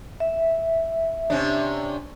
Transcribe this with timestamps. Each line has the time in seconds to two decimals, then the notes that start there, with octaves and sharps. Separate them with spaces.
0.20 E5
1.30 C3 C#4 D4